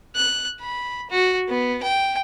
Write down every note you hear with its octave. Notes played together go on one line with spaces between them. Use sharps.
F#6
B5
F#4
B3
G5